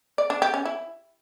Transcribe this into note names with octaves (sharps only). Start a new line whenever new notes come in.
D5
D4
G4
C#4
E4